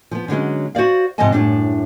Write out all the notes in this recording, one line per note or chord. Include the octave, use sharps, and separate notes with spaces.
F3 B3
D3 F#3 G#3 C#4
F#4 C5 D5 F5
G#2 C3 F3 D#5 G#5 A5
F#2 A2 C#3 G3 D4